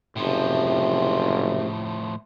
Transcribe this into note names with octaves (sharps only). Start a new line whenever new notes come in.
F#1 A2 C3 F3